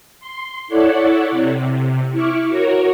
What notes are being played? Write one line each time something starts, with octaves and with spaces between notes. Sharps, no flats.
C6
E4 A4 C#5 D5 F#5
C3
E4 C#6 D6 F6
F#4 A#4 C#5